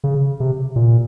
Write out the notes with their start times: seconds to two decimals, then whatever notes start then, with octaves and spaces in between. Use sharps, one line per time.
0.04 C#3
0.40 C3
0.76 A#2